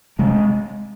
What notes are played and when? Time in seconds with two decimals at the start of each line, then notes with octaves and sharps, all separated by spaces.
0.19 C3 G#3